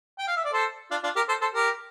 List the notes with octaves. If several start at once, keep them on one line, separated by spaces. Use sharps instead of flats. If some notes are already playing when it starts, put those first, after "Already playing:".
G5
F5
E5
D5
A4 C5
D4 F4
D4 F4
G4 A#4
A4 C5
A4 C5
G4 A#4